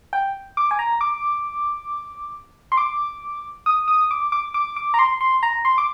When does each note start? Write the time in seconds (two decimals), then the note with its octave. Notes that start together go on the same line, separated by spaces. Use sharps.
0.13 G5
0.57 D6
0.71 G#5
0.79 A#5
1.01 D6
2.72 C6
2.78 D6
3.66 D#6
3.88 D#6
4.11 D6
4.32 D6
4.54 D6
4.76 D6
4.94 A#5
4.99 C6
5.21 C6
5.43 A#5
5.65 C6
5.78 D6